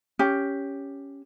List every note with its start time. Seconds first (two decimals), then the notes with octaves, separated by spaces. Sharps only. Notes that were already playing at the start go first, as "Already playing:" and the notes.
0.19 C#4 G4